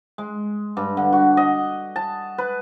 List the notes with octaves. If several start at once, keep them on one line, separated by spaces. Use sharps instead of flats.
G#3
G2
D3
F#4
D#5
A5
B4